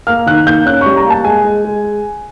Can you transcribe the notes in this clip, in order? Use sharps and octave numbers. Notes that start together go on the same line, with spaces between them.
A#3 F6
D#3 F#6
A#3 G6
C#4 F#6
G3 C#6
A#5
A#3 A5
G#3 G#5
G#3
G#3